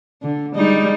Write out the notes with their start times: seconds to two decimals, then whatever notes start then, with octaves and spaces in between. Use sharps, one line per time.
0.22 D3
0.55 G3 G#3 D#4